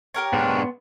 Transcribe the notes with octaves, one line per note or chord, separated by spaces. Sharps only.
G4 A#4 C#5
G#2 B3 D4 C6